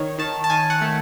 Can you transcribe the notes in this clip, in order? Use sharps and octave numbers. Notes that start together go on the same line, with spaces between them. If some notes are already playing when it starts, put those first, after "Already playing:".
Already playing: D#3 C#5
D#3 A5
A5
D#3 G#5
F#5
A3